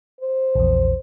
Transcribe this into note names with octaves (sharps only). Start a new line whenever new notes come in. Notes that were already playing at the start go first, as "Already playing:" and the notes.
C5
A#1 E2